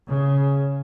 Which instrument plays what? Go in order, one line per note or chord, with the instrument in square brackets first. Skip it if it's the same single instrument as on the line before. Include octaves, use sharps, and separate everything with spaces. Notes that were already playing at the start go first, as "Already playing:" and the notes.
[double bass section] C#3